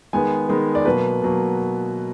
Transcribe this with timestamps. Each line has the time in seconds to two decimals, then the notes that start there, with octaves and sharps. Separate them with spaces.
0.13 D#3 G#3 B3 G#5
0.49 D#3 G#3 B3
0.75 D5
0.85 B2 F#3 A#3 B4
1.22 B2 F#3 A#3